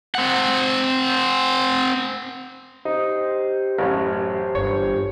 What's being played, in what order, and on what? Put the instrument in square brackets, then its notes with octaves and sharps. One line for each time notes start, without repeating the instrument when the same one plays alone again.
[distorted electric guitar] C4 F#5
[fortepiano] D#4 [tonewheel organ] G4 C5
[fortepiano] A1 F#2 C#4
[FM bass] G1 [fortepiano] C#5